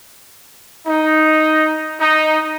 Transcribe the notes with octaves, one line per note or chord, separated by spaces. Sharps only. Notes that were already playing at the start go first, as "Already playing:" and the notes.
D#4
D#4